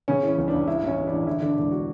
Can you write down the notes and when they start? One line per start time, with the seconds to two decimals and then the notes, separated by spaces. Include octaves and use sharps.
0.08 C#3 C#4
0.23 E3
0.28 C#4
0.38 C#2
0.48 D4
0.53 C#2
0.67 G2 E4
0.82 A1
0.87 C#4
0.97 A1
1.07 A1 D4
1.27 D3 E4
1.42 D3 D4
1.56 E1 D4
1.71 F#4